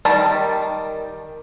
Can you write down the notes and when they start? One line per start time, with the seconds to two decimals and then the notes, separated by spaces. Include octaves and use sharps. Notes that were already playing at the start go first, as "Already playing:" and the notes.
0.05 D#3 G3 A#4 A5